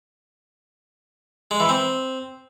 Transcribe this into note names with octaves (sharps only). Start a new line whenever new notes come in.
G#3
E3
C4